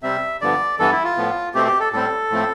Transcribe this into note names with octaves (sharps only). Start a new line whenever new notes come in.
C3 G3 C4 E5
G2 D3 F3 B3 D5
G2 E3 B3 A4
E4
F4
A2 F3 B3
B2 A3 C4 G4
G4
A4
A2 G3 C4 A4
A2 F3 A3 C4